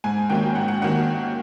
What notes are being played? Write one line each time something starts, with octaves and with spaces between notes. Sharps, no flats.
G#2 G#5
D#3 F#3 A#3 C#4 G5
G#2 F#5
F#5
D#3 F#3 A#3 C#4 F#5